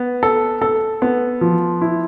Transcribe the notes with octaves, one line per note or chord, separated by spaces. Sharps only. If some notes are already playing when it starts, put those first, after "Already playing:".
Already playing: B3
A4
A4
B3
F3
E4